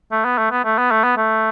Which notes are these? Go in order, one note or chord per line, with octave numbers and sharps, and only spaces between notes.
A3
B3
A3
B3
A3
B3
A3
B3
A3